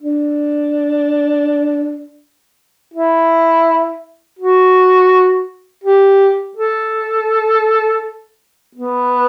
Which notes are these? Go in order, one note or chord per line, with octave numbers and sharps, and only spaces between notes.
D4
E4
F#4
G4
A4
B3